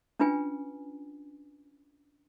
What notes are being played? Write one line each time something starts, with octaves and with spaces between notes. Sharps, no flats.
C#4 D4 F4 B4 G5 G#5